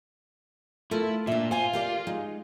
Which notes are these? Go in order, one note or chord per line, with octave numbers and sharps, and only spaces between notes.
A3 E4 F4 A#4
A#2 D4 E5
F4 C5 G#5
G4 A#4 D5
G#3 D#4